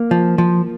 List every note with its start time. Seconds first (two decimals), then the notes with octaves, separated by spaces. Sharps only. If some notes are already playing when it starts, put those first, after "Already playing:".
Already playing: A#3
0.11 F3
0.38 F3